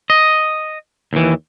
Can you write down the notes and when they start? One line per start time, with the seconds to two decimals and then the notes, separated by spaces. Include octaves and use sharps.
0.10 D#5
1.13 D#2 E3